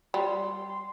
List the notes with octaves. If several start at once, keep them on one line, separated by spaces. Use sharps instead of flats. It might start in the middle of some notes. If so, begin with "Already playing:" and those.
G3 C6